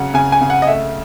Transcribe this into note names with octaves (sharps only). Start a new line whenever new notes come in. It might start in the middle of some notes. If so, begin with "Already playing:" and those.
Already playing: C#3 F#3 F#5
C#3 G#5
G#5
C#3
F#5
D#5
A3 E5